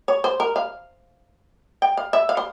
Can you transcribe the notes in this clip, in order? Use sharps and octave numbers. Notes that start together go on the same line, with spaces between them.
C#5
C5
A#4
F5
G5
F5
E5
F5
C5